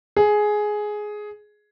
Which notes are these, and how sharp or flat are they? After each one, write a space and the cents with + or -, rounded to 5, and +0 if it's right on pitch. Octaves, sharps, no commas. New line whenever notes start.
G#4 +10